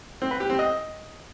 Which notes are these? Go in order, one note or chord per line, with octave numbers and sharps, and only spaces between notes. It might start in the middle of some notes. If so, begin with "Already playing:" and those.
C4
B4
G4
C4
D#5